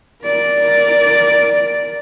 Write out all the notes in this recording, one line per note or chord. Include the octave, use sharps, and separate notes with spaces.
A#4 D5